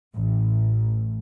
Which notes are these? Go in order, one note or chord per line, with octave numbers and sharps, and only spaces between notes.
A1